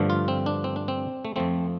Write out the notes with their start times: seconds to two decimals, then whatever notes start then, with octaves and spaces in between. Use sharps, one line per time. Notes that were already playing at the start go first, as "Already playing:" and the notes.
Already playing: G2 D3 F3 A3
0.10 F4
0.28 C4
0.46 D4
0.64 C4
0.76 D4
0.88 C4
1.25 A3
1.36 F2 F3 A3 C4